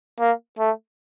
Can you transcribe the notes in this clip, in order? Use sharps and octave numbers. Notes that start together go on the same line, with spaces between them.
A#3
A3